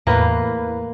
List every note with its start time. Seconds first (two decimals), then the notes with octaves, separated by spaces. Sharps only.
0.07 E2 A2 A#3 B4